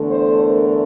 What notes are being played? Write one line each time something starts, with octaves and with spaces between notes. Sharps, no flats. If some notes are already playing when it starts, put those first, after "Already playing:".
Already playing: E2 D3 A3
C5
A#4